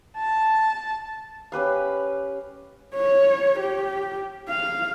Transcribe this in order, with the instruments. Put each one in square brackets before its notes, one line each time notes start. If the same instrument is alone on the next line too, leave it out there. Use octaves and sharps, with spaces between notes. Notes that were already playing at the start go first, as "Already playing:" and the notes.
[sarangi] A5
[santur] C#4 G4 B4 F5
[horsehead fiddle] C#5
G4
F5